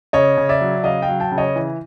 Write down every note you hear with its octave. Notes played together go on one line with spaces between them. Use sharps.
C#3 C#5 D#5
C#3
D5 E5
F#3
C#3 D#5 F5
F5 G5
F#3
G5 A5
C#3
C#5 D#5
E3